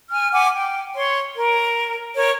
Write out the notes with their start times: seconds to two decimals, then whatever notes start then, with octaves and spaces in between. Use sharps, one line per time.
0.11 G#5 F6
0.31 F#5 G#5 D6
0.53 G5
0.95 C#5 C6
1.35 A#4
2.15 A#4 C#5